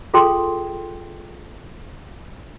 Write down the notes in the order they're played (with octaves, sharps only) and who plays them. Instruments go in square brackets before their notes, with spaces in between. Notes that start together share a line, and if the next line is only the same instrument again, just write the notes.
[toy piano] F4 G#4 A4 G5 A#5 C6